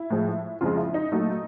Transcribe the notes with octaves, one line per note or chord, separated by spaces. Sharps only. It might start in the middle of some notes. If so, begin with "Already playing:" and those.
Already playing: E4
A2 F3 G#3
F2 C#3 F3 G#3 F4
E4
D#4
A#2 F#3 A3 D#4